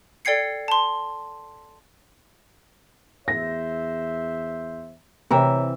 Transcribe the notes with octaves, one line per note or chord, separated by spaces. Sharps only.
A4 D5 G5 G#6 C7 C#7
A5 C6
E2 C5 E5 A#6
C3 E3 C#5 E5 G5 A#5